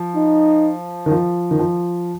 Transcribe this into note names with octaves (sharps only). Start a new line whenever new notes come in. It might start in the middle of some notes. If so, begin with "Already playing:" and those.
Already playing: F3
D#4
D#3
F3
D#3
F3